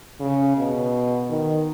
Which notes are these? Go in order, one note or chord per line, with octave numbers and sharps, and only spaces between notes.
C#3
B2
D#3